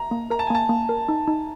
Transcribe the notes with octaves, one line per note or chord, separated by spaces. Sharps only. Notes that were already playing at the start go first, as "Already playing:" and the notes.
Already playing: A#5
A#3
A#4 A#5
A5
G#5
A#3 A5
A#3
A#4
D#4
D#4